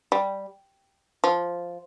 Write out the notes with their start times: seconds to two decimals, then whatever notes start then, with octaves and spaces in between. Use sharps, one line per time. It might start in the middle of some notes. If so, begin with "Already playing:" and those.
0.12 G3
1.24 F3